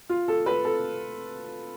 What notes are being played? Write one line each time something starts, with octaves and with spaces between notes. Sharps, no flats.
F4
A4
B4
A4